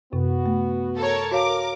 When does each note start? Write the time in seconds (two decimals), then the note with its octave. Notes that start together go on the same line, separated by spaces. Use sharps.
0.13 F#2 C3 B3 F#4
0.46 A3
0.98 A4 A#4 C#5
1.31 F#4 A#4 C#5 F5 D6